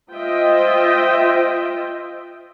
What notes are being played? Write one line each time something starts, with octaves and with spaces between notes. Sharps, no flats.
F4 C5 D#5 E5 G5